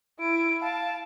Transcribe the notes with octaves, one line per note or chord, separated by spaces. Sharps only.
E4 D7
F5 A5